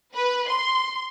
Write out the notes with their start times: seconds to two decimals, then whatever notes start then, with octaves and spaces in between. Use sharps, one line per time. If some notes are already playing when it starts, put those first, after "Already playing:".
0.15 B4
0.49 C6